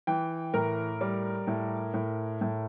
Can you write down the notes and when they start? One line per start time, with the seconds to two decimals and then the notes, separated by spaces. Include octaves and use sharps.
0.07 E3 G5
0.54 A2 A#4
1.01 G3
1.47 A2
1.94 A2
2.41 A2